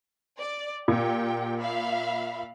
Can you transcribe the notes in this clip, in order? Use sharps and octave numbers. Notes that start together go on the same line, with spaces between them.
D5
A#2 G4 G5
E5 F5 B5